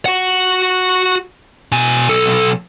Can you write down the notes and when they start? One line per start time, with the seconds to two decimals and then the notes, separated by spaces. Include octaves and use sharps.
0.06 F#4 F#5
1.72 B2 G#5
2.09 B1 A4